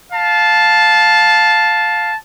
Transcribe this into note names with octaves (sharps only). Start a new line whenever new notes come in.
F5 A5